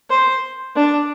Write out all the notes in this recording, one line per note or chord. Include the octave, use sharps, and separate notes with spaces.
C5
D4